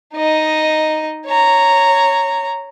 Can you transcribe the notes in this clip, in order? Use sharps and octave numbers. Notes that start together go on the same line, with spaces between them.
D#4 D#5
C#5 A#5